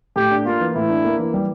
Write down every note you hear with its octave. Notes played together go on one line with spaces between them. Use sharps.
A2 G4
D4
A#3 F4
E3
A2 E4
D4
A#3
E3
G3